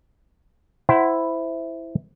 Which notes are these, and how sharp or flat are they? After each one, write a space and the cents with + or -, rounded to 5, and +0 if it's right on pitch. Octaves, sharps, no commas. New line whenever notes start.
E4 +0 C5 -15 F#5 +30